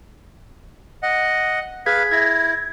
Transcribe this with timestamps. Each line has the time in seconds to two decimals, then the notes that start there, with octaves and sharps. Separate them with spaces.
1.03 D#5 F#5
1.86 G#4 B4 F5 G#6 B6
2.11 E4 G#6 A#6